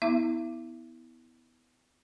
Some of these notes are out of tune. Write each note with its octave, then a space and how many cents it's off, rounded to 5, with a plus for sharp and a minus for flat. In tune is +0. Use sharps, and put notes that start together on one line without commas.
B3 +10 E4 -25 E5 +40